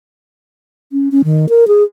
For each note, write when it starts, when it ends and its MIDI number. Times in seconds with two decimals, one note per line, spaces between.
0.92 1.09 61
1.12 1.22 61
1.24 1.46 51
1.49 1.67 70
1.68 1.83 68